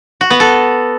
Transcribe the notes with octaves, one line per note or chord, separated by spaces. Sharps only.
F#4
B3
A4